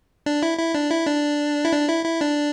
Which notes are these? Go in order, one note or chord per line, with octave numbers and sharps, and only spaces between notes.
D4
E4
E4
D4
E4
D4
E4
D4
E4
E4
D4